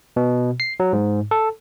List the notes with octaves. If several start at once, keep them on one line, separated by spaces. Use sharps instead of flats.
B2
C7
F#3
G#2
A4